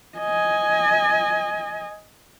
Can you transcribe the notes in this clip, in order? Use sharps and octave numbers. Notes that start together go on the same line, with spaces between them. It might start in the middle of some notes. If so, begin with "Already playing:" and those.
D#5 G#5